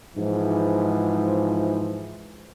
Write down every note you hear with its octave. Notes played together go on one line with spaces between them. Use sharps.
G#2 E3 F3